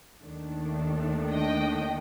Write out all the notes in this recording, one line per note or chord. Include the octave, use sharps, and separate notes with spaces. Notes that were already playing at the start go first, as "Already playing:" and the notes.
D#2 D#3 A3 D4
D#5 G5